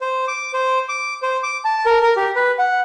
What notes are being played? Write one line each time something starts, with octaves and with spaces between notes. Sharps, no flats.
C5
D6
C5
D6
C5
D6
A5
A#4
A#4
G4
B4
F#5